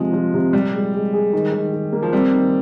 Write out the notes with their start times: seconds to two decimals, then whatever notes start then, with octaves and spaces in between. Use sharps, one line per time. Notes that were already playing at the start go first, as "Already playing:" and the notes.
Already playing: C3 F3 G#3 F4
0.13 F3
0.34 C3
0.53 A#2 G3
0.73 G#3
0.94 G#3
1.14 G#4
1.33 D#3
1.52 D#3
1.73 D#3
1.92 A#3
2.03 F3
2.13 G3 C4
2.33 D#3